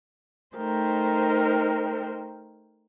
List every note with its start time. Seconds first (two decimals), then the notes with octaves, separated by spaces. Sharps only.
0.55 A3 D#4 A#4 C5 G5